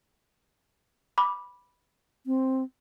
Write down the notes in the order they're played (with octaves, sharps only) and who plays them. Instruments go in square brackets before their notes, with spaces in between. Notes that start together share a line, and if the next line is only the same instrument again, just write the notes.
[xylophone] B5 D6
[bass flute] C4